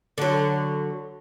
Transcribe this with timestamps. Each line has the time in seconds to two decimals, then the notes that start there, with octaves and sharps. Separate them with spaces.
0.18 D3 F#3